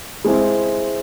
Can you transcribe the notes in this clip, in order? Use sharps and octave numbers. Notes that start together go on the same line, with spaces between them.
G#3 C4 E4